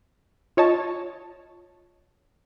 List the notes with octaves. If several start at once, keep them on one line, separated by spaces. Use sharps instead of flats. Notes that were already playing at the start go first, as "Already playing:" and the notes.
F4 C#5 D#5 A5